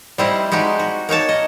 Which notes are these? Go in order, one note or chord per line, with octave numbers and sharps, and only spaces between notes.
G3 C4 E4 D#5
G#3 D#4 F#4 G4
F#4
A#3 D#4 C#5 A5
D#5